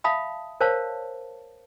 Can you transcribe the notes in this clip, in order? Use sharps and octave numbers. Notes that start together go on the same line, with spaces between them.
E5 F5 A5 B5 D#6
A#4 C5 C#5 F5 A5